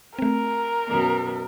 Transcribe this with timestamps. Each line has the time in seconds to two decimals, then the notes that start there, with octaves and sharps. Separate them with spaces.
0.19 A3 C4 A#4
0.87 F#2 B2 B3